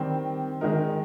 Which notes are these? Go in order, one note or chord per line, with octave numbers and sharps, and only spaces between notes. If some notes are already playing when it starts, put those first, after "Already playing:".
Already playing: D#3 G3 C4
D#3 G#3 D#4 A#4